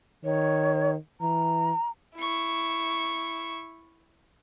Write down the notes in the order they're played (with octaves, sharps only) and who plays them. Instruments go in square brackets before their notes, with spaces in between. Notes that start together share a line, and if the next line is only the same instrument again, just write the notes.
[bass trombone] D#3 [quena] C#5
[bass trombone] E3 [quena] A#5
[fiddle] E4 C#6